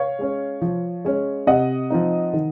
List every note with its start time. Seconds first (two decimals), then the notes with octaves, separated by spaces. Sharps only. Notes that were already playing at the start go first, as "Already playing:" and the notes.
Already playing: C#5 F5
0.19 G#3 C#4
0.62 F3
1.05 G#3 C#4
1.47 C3 D#5 F#5
1.90 F3 C4 D#4
2.34 D#3